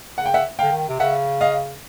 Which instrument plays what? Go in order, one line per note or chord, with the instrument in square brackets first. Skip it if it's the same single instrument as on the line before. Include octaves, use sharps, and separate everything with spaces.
[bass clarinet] C#3 [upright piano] F#5
[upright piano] G5
E5 F#5
[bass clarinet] D3 [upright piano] F5 G5
[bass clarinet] D#3
C3
[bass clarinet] C#3 [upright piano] E5 F#5
[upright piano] D#5 F5